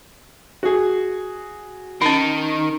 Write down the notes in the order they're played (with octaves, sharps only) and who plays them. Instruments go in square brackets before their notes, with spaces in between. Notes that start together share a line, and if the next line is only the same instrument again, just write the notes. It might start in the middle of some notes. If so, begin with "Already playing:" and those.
[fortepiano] F#4 G#4
[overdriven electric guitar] D#3 [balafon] C#4 D#4